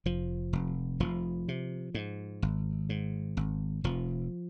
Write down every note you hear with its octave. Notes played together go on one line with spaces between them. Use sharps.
F1 F3
F1
F1 F3
C3
G#2
G#1
G#2
G#1
F1 F3